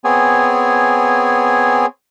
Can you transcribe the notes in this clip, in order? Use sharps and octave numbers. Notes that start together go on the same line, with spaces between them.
B3 C4 G#4 C#5 G#5